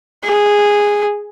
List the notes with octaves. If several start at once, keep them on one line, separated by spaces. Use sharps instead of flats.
G#4